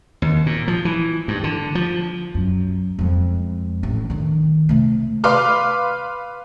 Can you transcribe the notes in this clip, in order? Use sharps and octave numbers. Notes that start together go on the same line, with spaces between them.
D#2
A#2
F3
E3
G2
D3
F3
F#2
F2 G#3
A1
D3 D#3
C3 A3
B4 F5 C6 D6 F6